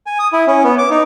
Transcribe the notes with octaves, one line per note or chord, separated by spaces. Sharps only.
G#5
D#6
E4
C#4
B3
D6
D#4